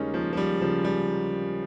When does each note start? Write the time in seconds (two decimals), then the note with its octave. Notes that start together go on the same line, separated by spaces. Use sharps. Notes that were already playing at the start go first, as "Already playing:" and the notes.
Already playing: D#2 C#3 G3 G#3 A#3 C#4 D#4
0.14 D#2 F3
0.33 F3
0.37 G3
0.61 C#3 F3
0.85 G3